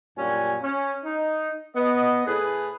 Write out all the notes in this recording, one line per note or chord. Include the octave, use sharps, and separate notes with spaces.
F#2 A#2 G3 C#4 D4 G#5
C#4
D#4
B3 D#5
A2 G#4 B4